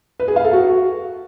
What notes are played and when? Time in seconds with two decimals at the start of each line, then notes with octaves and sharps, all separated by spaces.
0.20 B4
0.28 G#4
0.36 F5
0.44 A4
0.53 F#4